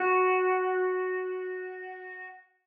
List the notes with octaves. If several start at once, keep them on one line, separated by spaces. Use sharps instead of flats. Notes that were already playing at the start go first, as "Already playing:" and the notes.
Already playing: F#4